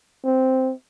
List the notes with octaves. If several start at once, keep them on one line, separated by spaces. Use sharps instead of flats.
C4